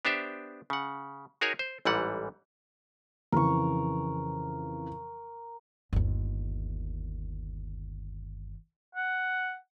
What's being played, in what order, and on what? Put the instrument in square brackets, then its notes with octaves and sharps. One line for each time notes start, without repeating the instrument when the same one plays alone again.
[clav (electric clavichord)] B3 D4 G4 C5 E5
C#3 F#5
D#4 F#4 G#4 A#4 C#5 G#5
C5
A1 G#2 E3 G3 F#5
[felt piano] F2 C#3 E3 [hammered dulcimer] A#4 C#6
[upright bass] G1 D#2
[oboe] F#5